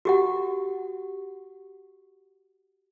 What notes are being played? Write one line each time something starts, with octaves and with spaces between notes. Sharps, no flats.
F#4 G4 F#5